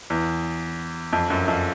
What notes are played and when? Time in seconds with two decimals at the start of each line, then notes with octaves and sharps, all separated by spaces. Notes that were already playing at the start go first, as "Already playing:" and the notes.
0.10 E2
1.13 F2
1.30 F#2
1.48 F2